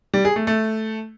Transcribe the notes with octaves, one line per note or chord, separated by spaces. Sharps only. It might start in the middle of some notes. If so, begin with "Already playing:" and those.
G3
G#4
A3
A3